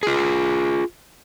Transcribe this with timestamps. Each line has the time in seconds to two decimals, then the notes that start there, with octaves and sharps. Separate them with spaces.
0.03 F4 G#4